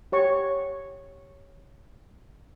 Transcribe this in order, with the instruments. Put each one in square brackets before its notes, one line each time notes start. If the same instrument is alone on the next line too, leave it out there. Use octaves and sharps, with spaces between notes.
[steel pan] G4 C#5 C#6